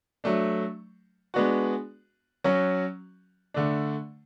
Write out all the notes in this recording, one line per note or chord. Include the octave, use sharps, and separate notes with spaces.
F#3 A3 D4
G#3 B3 D4 F#4
F#3 C#4 F#4
D3 A3 D4